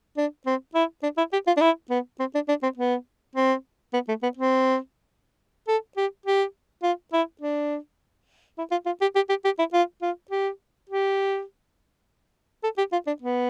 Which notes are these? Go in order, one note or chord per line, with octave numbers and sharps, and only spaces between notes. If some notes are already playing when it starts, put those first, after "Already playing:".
D4
C4
E4
D4
E4
G4
F4
D4
E4
B3
C4
D4
D4
C4
B3
C4
B3
A3
B3
C4
A4
G4
G4
F4
E4
D4
E4
F4
F4
G4
G4
G4
G4
E4
F4
F4
G4
G4
A4
G4
F4
D4
B3